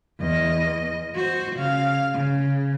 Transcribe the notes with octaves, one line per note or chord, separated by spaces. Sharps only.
E2 D#5
F#4 C5
C#3 F5
C#3